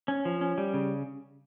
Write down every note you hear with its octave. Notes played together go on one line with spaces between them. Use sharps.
C#4
F3
C#4
G3
C#3